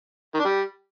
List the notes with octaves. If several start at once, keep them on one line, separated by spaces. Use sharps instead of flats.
D#3
D4
G3